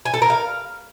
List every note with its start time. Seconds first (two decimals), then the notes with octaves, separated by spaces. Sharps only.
0.05 G#5
0.14 A4
0.22 A#4
0.30 F5